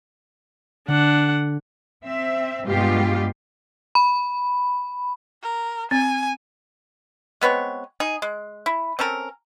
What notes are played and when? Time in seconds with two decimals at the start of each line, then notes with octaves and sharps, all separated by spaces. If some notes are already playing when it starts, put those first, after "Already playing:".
0.88 D3 D4 F#5
2.03 C4 E5
2.65 G2 B2 G#3 F4 G4
3.95 B5
5.43 A#4
5.91 C4 G#5
7.41 G#3 B3 C4 C#5
8.00 D#4 G#4
8.22 G#3
8.66 E4
8.99 C4 C#4 A4 A#4